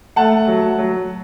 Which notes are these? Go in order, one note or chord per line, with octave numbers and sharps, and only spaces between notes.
A3 F#5 A5
F#3
F#3